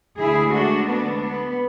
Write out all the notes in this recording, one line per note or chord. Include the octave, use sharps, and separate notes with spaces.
D2 D3 G#3 E4 G#4
D4 F#4
B3 D4
B3